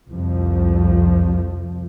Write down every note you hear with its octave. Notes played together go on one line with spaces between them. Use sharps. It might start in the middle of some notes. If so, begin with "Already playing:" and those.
C2 F2 F3